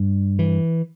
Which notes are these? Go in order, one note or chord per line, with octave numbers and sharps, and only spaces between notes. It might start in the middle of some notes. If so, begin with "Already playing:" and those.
Already playing: G2
E3